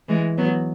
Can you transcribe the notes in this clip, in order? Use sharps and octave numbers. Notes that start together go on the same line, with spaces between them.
E3 G#3
F#3 B3